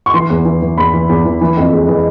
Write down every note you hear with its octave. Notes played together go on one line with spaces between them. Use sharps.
C#6
E3 C6
E2
E3
E3
E2 B5
E3
E2
E3
E3
F2
G#3
E3